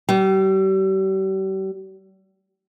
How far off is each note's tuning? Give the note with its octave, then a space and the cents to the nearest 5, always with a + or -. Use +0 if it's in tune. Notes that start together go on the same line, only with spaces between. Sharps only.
G3 -40